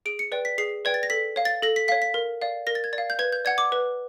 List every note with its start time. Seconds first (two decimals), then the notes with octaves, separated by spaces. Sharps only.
0.06 G#4 D7
0.19 C#7
0.32 B4 D5 G5
0.45 B6
0.58 G#4 C7
0.85 B4 D5 G5 G#6
0.94 A6
1.03 A#6
1.10 A4 B6
1.36 C#5 F5
1.45 A6
1.62 A4 A#6
1.76 B6
1.88 C#5 F5 B6
2.02 B6
2.14 A#4
2.42 D5 F5
2.67 A#4 A#6
2.75 A6
2.84 G#6
2.93 D5 A6
2.98 F5
3.10 G6
3.19 B4 G#6
3.32 G6
3.45 D5 F#5 G#6
3.58 D6
3.72 B4